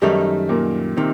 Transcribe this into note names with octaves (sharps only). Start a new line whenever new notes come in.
F#2 D#3 G3 A3 D#4
A#2 A#3
C3 D#3 C4